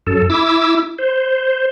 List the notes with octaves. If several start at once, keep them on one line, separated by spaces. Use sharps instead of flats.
F#2 A4
E4 D6 E6
C5